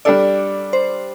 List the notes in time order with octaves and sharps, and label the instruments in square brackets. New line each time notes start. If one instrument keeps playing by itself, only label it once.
[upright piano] G3 D4 A4 [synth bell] D5
[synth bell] C5